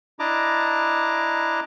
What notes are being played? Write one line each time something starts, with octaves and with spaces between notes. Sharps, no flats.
D4 E4 D#5 A5 A#5 D6